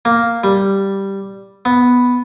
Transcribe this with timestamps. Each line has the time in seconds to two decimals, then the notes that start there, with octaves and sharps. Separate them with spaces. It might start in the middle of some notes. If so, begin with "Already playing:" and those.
0.05 A#3
0.44 G3
1.65 B3